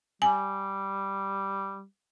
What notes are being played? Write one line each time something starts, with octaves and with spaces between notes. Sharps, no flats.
G3 G#5